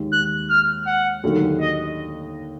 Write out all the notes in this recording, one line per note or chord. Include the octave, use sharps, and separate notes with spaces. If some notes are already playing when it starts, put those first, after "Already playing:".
Already playing: D#2 D#3 G#3
F#6
F6
F#5
D#2 D3 F#3 A#3 D#4
D#5